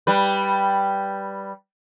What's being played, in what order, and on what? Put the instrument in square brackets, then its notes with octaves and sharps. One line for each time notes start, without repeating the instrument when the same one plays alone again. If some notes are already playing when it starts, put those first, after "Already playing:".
[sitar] G3 B4